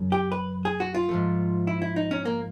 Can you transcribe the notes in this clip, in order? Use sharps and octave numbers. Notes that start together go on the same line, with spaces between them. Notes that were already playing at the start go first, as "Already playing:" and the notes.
Already playing: F#2 C#3 F#3
G4
B4
G#4
F#4
F4
G#2 F3 A3
E4
E4
D#4
C#4
A#3